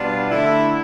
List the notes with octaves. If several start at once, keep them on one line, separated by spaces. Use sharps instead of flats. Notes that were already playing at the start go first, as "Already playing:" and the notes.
Already playing: B2 G3 D4 F4
D3 A3 E4